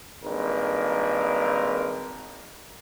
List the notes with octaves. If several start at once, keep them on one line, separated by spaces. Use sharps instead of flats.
G#1 G2 A#3 A#4